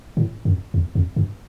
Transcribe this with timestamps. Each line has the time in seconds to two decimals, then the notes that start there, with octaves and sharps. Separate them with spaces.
0.17 A2
0.45 F#2
0.74 E2
0.95 F2
1.16 G2